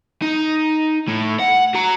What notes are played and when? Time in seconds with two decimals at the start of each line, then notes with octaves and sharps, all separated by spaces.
0.22 D#4
1.08 A2
1.39 F#5
1.75 F#4 A#5